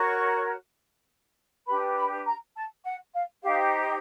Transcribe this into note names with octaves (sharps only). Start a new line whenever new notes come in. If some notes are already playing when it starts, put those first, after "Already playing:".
Already playing: F#4 A#4 C#5 C#6
D4 G4 B4 B5
B5
A#5
A5
F#5
F5
D#4 G4 C5 F5